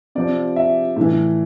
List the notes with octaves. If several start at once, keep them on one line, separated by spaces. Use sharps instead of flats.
C3 F3 D5
E5
A2 E3